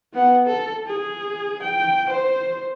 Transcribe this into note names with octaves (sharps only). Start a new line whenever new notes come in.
B3 F#5
A4
G#4
G5
C5